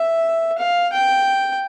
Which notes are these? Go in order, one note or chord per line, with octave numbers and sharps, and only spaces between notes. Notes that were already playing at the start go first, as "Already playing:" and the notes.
Already playing: E5
F5
G5